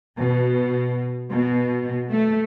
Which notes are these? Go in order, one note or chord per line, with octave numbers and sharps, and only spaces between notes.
B2
B2
A3